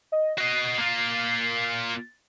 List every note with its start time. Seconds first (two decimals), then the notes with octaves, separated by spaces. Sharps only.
0.12 D#5
0.38 F#4 D#5 C7
0.78 A#3 F4